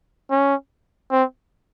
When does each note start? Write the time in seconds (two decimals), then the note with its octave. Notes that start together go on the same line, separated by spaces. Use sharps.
0.31 C#4
1.11 C4